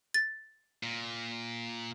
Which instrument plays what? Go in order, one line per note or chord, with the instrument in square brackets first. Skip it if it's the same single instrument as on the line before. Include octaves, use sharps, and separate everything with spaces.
[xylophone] A6
[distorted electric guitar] A#2